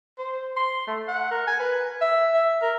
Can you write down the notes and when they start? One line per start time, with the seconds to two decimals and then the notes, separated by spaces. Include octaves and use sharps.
0.18 C5
0.56 C6
0.87 A3
1.08 F#5
1.31 A#4
1.47 G#5
1.59 B4
2.01 E5
2.34 E5
2.62 A#4